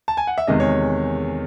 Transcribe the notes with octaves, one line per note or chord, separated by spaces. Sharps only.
A5
G#5
F#5
E5
E2 C3 D#3 G#3 D#5
C#5